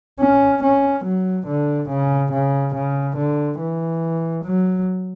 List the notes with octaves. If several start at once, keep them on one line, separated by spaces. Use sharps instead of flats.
C#4
C#4
F#3
D3
C#3
C#3
C#3
D3
E3
F#3